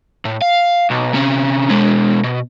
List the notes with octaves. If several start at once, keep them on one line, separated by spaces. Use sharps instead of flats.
A2
F5
B1
C3 C#4
B2 G#3
B2